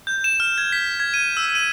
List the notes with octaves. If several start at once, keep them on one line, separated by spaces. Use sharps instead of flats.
G6
E7
F6
G#6
B6
G#6
D#7
E6
D#7